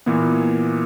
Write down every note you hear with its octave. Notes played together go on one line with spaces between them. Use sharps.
A#2 E3 A#3 B3